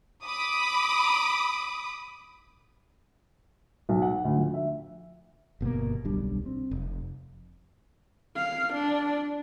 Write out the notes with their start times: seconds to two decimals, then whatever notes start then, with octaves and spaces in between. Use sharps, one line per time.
0.24 B5 D6 D#6
3.89 B1
4.02 F#5
4.25 D2
4.37 F3
4.54 E5
5.61 G1 B2 D#3 A#3
6.04 D1 B1 G3 D4
6.46 C4
6.71 F1
8.36 F5
8.74 D4